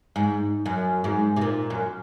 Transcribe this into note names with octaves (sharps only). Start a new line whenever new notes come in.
G#2
F#2
G#2
C3
A#2
F#2